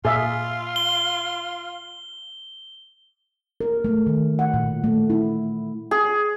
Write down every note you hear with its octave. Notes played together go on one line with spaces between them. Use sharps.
A#2 F4 G#4 E5
G7
A#4
A3
D#3
F#5
A#2
A3
E4
G#4